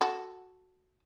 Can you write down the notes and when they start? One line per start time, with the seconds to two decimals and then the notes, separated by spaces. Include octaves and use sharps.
0.01 F#4 A4